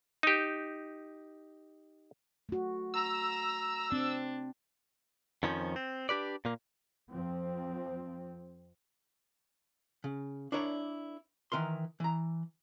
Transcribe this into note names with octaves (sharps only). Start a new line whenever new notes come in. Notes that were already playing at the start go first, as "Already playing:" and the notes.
D#4 G4
A3 F#4
A#5 E6
C4 D4
F2 D#3 F3 C#4
C4
D4 G4 B4 D5
A#2 A#3
F2 F3 C4
C#3
D4 E4 A#4 C#5 D5
D#3 E3 A#4 C6
E3 A#5